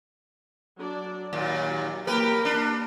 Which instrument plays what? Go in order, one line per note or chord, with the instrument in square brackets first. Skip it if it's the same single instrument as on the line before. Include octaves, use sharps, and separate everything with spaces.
[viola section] F#3 D4 D5
[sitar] D#2 A#2 [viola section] F#3
[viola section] A#3 [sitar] G4 B4 [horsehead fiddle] A#4
[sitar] D4